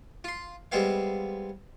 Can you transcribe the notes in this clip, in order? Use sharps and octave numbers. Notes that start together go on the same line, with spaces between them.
F4 C6
G3 G#3 B3 C4 F5